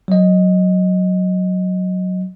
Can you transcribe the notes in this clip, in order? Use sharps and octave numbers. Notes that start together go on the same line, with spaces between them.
F#3 D#5